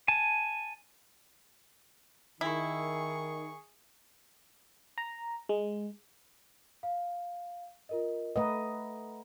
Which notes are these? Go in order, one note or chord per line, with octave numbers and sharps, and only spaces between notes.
G#5 A5
D#3 E4 G#4 C#6
A#5
G#3
F5
F4 A#4 D#5
A3 B4 D#5 F#5 A#5